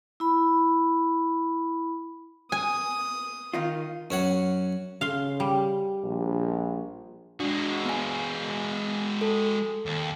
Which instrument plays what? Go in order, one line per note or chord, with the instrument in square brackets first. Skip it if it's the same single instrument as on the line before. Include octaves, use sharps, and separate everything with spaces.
[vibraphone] E4 B5
[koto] G#5 [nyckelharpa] D#6
[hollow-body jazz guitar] D#3 D#4 F4
[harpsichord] F#2 C#5 F#5
[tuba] C#3 [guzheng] F5 C6
[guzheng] G3
[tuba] A#1
[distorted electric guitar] G#3 F#4 [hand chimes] D4
[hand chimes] B3 G#5
A4
[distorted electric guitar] D#2